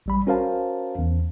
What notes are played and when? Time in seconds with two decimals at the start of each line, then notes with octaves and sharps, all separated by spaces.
0.06 A1 G3 B5
0.27 C#4 F#4 A#4 C5 F5 A5
0.99 E2